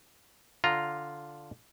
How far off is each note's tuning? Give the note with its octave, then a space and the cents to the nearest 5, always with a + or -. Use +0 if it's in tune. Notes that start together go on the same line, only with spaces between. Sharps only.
D3 +0 F4 +0 A#5 +0